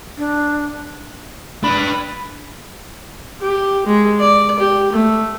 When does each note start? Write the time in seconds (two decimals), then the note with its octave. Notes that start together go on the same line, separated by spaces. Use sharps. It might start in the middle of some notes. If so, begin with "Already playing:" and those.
0.18 D4
1.64 D4 B4 B5
3.41 G4
3.87 G#3
4.20 D5
4.59 G4
4.93 A3